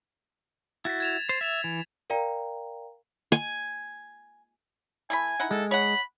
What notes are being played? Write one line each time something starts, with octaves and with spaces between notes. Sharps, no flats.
E4 F#4 A6 B6
G#6 E7 F7
C5 A6
E5 B6 E7 F7
E3
A#4 D5 F5 G5 A#5
G#5
E3 A3 G#5 B5
D#4 E4 F#5
G#3 A4
C#5 F#5 B5